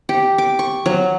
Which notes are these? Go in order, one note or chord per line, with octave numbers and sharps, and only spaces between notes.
G4
D6
C#6
F#3